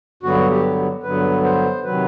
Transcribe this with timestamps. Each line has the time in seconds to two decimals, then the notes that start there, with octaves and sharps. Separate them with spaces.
0.23 G2 D3 F#3 B3 F#4
0.50 G4
1.03 G2 D3 F#3 B3 B4
1.44 C5
1.83 C3 D#3 F#3 B4